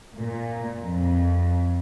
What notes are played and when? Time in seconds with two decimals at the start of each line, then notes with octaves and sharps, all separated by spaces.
0.18 A#2
0.82 F2